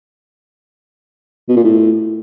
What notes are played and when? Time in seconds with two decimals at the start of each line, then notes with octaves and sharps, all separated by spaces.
1.49 B2
1.56 A#2
1.64 A2